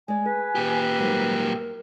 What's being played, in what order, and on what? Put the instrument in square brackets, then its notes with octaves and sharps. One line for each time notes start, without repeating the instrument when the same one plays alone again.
[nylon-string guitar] G#3 D5 [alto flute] G#5
[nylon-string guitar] G#4 [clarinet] B4
[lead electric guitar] A#2 G4
[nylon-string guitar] G#2 F#3 G3 [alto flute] A#4